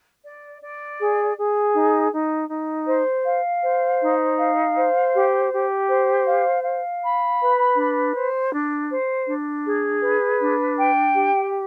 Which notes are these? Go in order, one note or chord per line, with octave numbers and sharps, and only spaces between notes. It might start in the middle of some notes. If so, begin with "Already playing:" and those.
D5
D5
G#4
G#4
D#4
D#4
D#4
C5
F5
C5
D#4
F5
C5
G4
G4
C5
F5
F5
B5
B4
D4
C5
D4
C5
D4
G#4
B4
D4
G5
G4